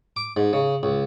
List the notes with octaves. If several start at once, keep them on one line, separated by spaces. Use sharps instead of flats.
D6
G#2
C#3
C#2